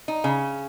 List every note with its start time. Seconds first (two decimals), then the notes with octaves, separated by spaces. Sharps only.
0.08 D#4
0.24 C#3